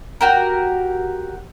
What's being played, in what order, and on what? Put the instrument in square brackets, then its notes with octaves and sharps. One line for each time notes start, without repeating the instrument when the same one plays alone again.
[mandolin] F#4 G4 A#4